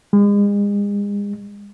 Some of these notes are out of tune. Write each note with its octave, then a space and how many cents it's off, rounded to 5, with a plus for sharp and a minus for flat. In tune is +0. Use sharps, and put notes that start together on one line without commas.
G#3 -40